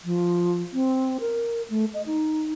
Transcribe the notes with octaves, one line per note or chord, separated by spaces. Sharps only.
F3
C4
A#4
A3
D#5
D#4